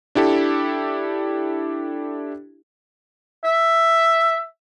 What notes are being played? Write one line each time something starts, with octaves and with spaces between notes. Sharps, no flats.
D4 E4 G4 A4
E5